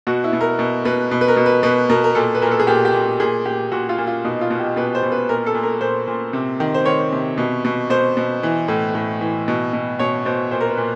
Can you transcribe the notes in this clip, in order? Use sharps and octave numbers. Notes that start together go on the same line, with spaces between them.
B2 F#4
E4
B2
A#4
B2
B2 B4
B2
B4
A#4
B2
B4
B2 B4
B2 A#4
A#4
A#2 A4
B4
A#2 A#4
A4
G#4
A#2 G4
G4
A#2
A#2 G#4
A#2 G4
A#2 F#4
F4
A#2
F4
B2 D#4
F4
B2
G4
B2 B4
C5
B2
B4
A#2 A#4
A4
A#2
A#4
A#2 C5
A#2
C3
D#3
C5
D#3 C#5
C3
B2
B2
B2 C5
B2
E3
A2
A2
E3
B2
B2
B2 C#5
B2 C5
A#2 C5
A#4
B4
A#2